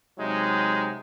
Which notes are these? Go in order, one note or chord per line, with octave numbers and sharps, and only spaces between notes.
C3 F#3 G#3 D#4